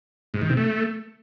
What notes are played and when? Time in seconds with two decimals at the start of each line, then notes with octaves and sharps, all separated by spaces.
0.34 G#2
0.42 D#3
0.49 C3
0.57 A3